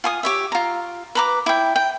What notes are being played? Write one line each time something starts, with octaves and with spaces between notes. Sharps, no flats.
F4 G#5 D#6
G4 C#5 E5
F4 A#5
B4 A#5 D6
E4 G5
G5